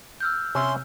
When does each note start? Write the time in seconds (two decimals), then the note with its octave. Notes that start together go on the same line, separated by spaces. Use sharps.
0.20 E6 F6 G6
0.55 C3 C#4 E5 C6